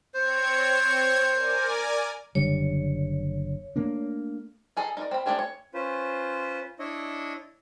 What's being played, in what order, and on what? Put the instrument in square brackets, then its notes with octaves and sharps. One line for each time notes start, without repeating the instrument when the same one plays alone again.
[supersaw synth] C4 C#5 G#6 [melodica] C5
[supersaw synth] A#4 D5 G#5
[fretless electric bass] F#1 D3 G3 [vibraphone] C#5
[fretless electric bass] A3 A#3 D4
[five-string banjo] D#4 G#4 A4 D#5
D#4 A#4 D5
C4 B5
A3 C4 D4 G4 G#4
C#5
[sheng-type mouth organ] C#4 F4 B4 C5
D4 E4 C#5 D#5